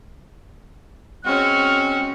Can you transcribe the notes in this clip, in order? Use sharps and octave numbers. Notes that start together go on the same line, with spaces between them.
G#3 C4 C#4 F#4 F6